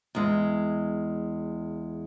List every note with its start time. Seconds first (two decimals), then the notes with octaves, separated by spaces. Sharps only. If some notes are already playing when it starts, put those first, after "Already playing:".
0.15 E2 G#3